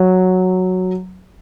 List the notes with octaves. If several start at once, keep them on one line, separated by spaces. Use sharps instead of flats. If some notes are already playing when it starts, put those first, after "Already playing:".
Already playing: F#3